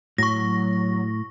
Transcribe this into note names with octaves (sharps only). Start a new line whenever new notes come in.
A2 F#3 C#6 A#6